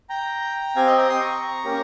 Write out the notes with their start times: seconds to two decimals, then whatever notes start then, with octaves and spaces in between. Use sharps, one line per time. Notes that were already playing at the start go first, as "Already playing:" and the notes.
0.09 G5 A#5
0.76 C4 G4 F5 G#5
0.87 D#5 G5
0.98 G5 A#5
1.09 C6 D#6
1.20 A#5 C#6
1.65 A#3 C#4 G4